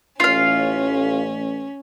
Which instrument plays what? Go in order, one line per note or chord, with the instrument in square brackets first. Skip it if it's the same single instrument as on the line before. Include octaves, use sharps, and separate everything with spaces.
[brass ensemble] A1 [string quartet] C#4 [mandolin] F4 F5